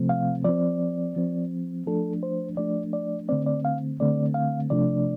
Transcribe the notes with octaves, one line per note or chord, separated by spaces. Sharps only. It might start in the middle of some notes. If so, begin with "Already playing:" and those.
Already playing: C3 F3 A3 C4
F5
F3 C4 D5
F3 C4
F3 A3 D4 A4
C5
F3 A3 D4 D5
D5
D3 A3 C4 D5
D5
F5
D3 A3 C4 D5
F5
C3 F3 A3 D4 D5